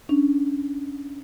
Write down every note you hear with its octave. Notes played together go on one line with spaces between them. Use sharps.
C#4 D4